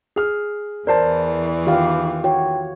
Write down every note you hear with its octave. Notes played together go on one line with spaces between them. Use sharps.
G#4 F6
E2 E3 A#4 C5 D5 A5
D#3 F4 G4 F5
F#4 C#5 G5